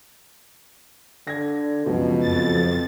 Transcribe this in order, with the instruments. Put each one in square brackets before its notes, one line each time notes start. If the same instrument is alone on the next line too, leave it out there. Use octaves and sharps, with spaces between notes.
[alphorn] D3 [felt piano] G#6 A#6
[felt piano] C#2 F#2 F3 [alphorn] B2
[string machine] F2 A6